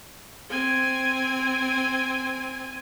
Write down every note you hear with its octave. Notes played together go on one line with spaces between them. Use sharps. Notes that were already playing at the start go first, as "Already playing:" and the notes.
C4 G#5